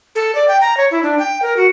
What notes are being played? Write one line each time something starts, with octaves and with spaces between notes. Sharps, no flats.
A4
D5
G5
A#5
C#5
E4
D4
G5
A#4
F#4